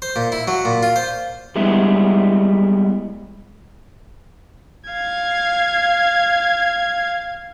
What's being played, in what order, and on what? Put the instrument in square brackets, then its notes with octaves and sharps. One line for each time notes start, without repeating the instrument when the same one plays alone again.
[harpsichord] C5
A#2
E4
F#3
A#2
F4
C5
[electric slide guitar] G3 G#3 B3 E4
[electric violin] F5 G#6